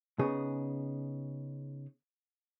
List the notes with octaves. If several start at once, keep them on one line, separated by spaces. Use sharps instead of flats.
C#3 B3 D#4 G#4